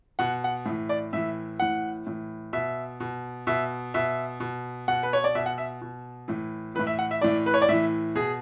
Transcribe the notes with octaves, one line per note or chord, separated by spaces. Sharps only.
B2 F#5
F#5
A2 E3
D5
A2 E3 E5
A2 E3 F#5
A2 E3
B2 E5
B2
B2 E5
B2 E5
B2
B2 F#5
B4
C#5
D5
B2 E5
F#5
E5
B2
A2 E3
A2 E3 B4
E5
F#5
E5
A2 E3 D5
B4
C#5
D5
A2 E3 E5
B2 G#4